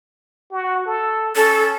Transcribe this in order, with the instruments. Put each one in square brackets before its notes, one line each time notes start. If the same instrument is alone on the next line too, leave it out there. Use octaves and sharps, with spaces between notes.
[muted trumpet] F#4
A4
[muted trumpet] C#4 [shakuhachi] A4